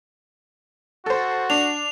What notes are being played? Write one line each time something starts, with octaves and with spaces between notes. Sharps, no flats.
F#4 A4 C5
D4 F7